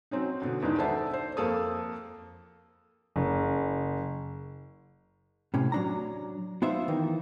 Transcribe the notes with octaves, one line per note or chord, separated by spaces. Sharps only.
F#3 C4 C#4 D#4
B2 D3
E2 G#2 D#3 D4 D#4
A4 C5 D5 E5 F#5 A5
C5
F2 A#3 A4 D#6
F#1
A2 C3 C#4
F#3 D4 A#5
B3 D#4 F4 C5 E5
D#3 E3 D#4